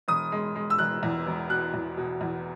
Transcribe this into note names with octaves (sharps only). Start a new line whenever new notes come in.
E1 D#6
G#3
G#3
E6
E1 F#6
E2
E1
B2 F#6
E2
B2
E2